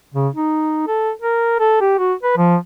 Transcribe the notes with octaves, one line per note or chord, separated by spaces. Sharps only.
C#3
D#4
A4
A#4
A4
G4
F#4
B4
F3